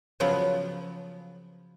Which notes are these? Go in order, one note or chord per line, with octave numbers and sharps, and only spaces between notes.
C#3 F3 F#3 B3